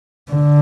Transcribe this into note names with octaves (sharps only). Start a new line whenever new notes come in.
D3